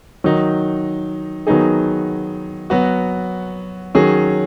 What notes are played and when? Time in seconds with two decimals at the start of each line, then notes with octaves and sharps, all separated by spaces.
0.24 D#3 F#3 D#4
1.47 D#3 F#3 B3 D#4 G#4
2.70 F#3 B3 F#4
3.95 D#3 F#3 C#4 G#4